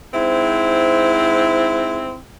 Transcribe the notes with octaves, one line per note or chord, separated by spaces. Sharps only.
G#2 C4 E4